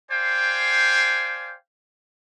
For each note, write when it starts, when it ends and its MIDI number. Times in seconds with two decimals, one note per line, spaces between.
0.11 1.54 72
0.11 1.54 74
0.11 1.54 77
0.11 1.54 79
0.11 1.54 80